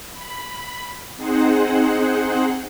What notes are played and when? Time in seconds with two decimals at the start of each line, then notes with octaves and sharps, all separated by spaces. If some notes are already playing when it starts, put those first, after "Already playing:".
0.12 B5
1.16 C4 D#4 G#4 C5 F#5